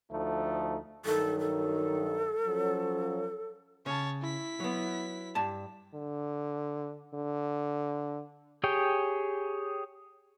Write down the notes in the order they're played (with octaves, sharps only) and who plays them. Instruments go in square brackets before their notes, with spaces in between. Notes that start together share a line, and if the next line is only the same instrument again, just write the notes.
[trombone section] D2 F3 A3 D#4
[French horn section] G2 D#3 F#3 [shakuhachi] A4
[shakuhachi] A4
[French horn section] F3 F#3 C#4
[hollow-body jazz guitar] C#3 [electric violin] C#5 A5
[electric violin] E4 B6
[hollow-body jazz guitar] F#3 B3
G2 A5
[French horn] D3
D3
[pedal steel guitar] G4 G#4 C#5 G5